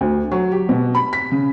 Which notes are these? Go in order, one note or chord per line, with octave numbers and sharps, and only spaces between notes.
D2
F#3
G4
B2
B5
B6
C#3